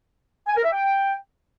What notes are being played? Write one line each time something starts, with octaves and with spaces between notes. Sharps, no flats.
G#5
A#4
E5
G5